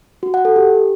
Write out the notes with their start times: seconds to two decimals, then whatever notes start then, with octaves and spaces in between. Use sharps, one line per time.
0.23 F#4
0.34 F#5
0.45 A4
0.56 G4